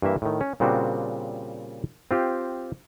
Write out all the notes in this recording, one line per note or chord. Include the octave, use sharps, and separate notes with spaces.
G2 E3 A#3 E5
A2 D#3
C#4
A#2 C#3 G3 C4 D4 F#4
C4 F4 G4